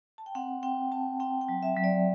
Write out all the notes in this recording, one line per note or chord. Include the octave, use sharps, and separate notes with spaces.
A5
G5
C4 F#5
C4 G5
C4 A5
C4 G5
G5
F#3
E5
F#3
D5